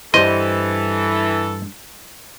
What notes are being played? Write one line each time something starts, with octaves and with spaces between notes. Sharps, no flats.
G2 E3 A4 C5 D#5 C6